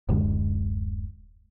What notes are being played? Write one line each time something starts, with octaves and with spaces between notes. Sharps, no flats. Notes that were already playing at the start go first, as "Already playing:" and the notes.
D1 F#2 D3 G#3